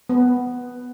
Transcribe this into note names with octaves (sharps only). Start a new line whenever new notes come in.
B3